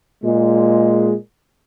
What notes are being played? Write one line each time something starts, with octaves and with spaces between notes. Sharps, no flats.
A#2 G#3